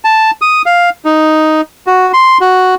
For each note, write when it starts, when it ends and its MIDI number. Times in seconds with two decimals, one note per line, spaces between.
0.05 0.31 81
0.42 0.62 87
0.66 0.90 77
1.05 1.61 63
1.87 2.12 66
2.14 2.38 84
2.41 2.75 66